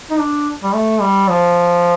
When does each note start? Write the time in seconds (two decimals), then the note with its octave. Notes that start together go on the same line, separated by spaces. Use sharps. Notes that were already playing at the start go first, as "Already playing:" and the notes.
0.11 D#4
0.20 D4
0.64 G3
0.74 A3
1.02 G3
1.29 F3